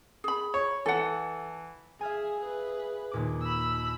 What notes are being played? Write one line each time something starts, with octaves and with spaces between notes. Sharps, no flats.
G#4 B5
C#5
E3 A4 F#5
G#4 E5 F5 G#5
G#4 B4
D#2 A#2 D6
B5 E6